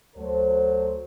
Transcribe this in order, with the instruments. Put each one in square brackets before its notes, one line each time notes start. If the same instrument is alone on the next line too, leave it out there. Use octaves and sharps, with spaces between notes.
[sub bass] D2 [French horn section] F#3 A4 C5